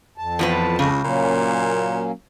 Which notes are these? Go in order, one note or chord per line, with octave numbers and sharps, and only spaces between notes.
F2 A5
E2 F3 B4
C#2 C#3
A#2 F#3 A#3 C#4